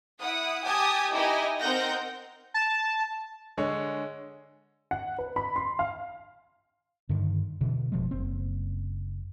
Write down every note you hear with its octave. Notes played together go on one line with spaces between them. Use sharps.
E4 F#5 D#6
G4 G#5 A5 D#6 G#6
D#4 E4 G4 D#5 G#5
C4 D#4 A#4 F#5 G6 A#6
A5
D3 G#3 C#5
F#5
B4
B5
C6
F5
G2 D3 D#3
B2 D3 E3
F1 B2 F3 G#3
F#1 C4